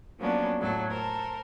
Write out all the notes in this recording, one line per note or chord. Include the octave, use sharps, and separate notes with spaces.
F3 F#3 A#3 B3 C#4 D4
F2 A2 F#3 A4
A4 A#4 C5